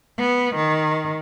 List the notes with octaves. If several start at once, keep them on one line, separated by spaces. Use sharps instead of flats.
B3
D#3